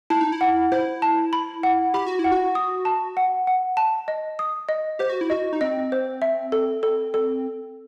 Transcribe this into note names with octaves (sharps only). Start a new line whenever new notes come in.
E4 A5
D#4
E4
F#5
E4 C5
A5
B5
F#5
G4 B5
F#4
E4
F#5
F#4
D#6
A5
F#5
F#5
A5
D#5
D#6
D#5
G4 C5
F#4
E4
F#4 D#5
D#4
C4 D#5
C5
E5
A4
A4
A4